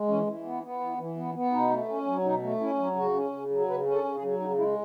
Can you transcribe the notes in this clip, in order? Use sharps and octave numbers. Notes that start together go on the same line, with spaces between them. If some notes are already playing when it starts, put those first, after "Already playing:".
Already playing: G#3
E3 C#4
E3
B3
B3
E3
E3
B3
B3
B2 D#4
A3
C#4
F#3
B2 D#4
A3
C#4 E4
F#3
C#3 F#4
C#4
C#3
F#3
C#3 B4
C#4
A4
C#3
G#4
F#3
C#3 D#4
G#3 E4